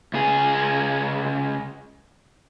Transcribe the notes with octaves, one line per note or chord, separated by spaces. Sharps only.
C#2 G#4